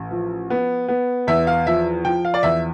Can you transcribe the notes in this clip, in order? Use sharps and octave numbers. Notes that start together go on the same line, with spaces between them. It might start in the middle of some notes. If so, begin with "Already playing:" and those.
Already playing: A1
F3
B3
B3
E2 E5
F5
F3 E5
F3 G5
F5
D5
E2 E5